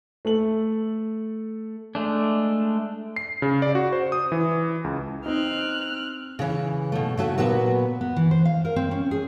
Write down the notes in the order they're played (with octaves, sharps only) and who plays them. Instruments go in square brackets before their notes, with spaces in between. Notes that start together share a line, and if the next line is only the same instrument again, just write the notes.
[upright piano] A3 A4 F#7
[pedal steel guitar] G#3 A3 D4
[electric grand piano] C7
C#3
D5
F#4
C5
D#6
E3
C#2
[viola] C4 [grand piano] D#4 [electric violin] F6 F#6
[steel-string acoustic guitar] C#3 E3
B2 A3
C#3 A3 F#4
A#2 F#3 B3 F#4 B4
B3
E3
C5
F5
A#4
C4
C#4
G#4